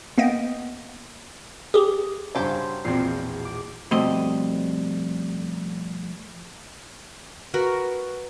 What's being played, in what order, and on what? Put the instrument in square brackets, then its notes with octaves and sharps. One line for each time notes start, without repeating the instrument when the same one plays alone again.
[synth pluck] A#3 B3 D#5 G5
G4 G#4
[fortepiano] G2 C#3 [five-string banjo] F#3 G4 C5 [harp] G#5 A5 C6
[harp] E1 A#1 C7 [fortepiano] A#2 C4
[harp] D6
[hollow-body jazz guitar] F2 B2 G3 A3 C4 D#5
[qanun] F#4 A#4 B4